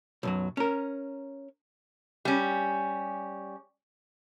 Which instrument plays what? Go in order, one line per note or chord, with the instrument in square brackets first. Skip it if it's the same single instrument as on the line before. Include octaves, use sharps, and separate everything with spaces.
[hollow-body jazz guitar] B1 F#2 F#3
C#4 A#4
[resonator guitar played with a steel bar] G3 C#4